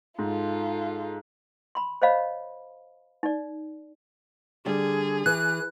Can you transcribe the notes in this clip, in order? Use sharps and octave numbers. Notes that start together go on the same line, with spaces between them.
G#2 F4 A4
B5 C6
C5 C#5 D#5 F5 B5
D#4 D5
D3 G3 G#4
E3 F#6